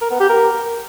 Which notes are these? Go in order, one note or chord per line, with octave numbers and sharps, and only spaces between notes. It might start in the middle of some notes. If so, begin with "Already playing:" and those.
A#4
B3
G4
A#4